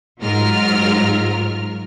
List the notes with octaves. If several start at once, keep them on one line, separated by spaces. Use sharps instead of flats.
G#2 F#3 F4 A#4 F6